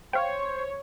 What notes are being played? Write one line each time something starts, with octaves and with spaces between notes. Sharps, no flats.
C5 C#5 F5 G5